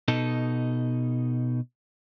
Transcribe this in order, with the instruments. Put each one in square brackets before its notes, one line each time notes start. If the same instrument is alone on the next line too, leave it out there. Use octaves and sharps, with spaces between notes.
[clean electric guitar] B2 D#4 A4